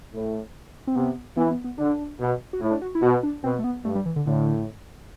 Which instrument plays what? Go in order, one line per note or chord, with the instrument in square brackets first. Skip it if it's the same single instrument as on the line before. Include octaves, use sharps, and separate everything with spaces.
[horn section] A2
[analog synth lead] C4
[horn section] C3 [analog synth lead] B3
[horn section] E3 [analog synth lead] B3
[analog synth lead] B3
B3
[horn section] D3 [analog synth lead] D4
[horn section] B2
[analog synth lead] F#4
[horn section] A2 [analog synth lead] E4
[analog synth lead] D4
F#4
E4
[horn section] B2 [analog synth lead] F#4
[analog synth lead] D4
[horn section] B2 [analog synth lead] C4
[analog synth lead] A3
B3
[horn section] G2 [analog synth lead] A3
[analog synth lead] G3
E3
D3
[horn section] A2 [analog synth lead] D3